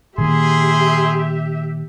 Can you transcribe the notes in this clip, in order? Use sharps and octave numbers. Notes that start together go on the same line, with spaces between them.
A#2 D#3 A#3 G4 G#4 E5 C6